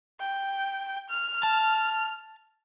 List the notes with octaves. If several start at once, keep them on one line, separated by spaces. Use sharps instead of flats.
G5
F6
A5